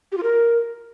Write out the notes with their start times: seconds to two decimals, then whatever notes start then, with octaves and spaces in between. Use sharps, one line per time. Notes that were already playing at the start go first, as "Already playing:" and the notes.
0.12 G4
0.17 F4
0.23 A#4